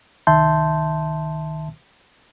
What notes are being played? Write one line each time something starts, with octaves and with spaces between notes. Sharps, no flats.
C2 D#3 E5 A5 C6 G6